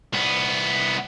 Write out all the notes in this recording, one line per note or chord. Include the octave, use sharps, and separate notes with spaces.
C2 B3